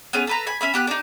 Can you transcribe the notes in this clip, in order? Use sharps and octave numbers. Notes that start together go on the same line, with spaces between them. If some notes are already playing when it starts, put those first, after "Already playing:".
B3 C#4 G#4
A4 B4 A#5
G#5 B5
C#4 E5 B5
B3 G4 F#6
D4 D#4